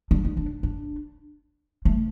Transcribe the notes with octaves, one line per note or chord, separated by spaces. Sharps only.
D4
D#4
D4
D4
A3